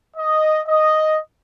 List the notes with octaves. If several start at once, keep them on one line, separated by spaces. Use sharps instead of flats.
D#5
D#5